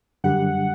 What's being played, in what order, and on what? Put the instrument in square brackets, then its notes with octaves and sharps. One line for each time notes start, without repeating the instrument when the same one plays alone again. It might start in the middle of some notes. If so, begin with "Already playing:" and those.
[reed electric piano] F#2 D3 G3 D4 G4 [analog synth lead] F#5